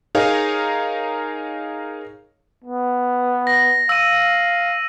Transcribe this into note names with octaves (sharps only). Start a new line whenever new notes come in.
D#4 G#4 A#4 C#5 F5
B3
A#6
F5 E6 D#7